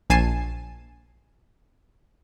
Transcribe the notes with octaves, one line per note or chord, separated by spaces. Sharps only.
A#1 G#5 A5 C7 D#7 E7